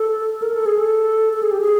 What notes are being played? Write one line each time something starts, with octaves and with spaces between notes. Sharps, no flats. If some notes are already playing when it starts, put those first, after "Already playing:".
Already playing: A4
A#4
A4
G#4
A4
A4
G#4
G4
G#4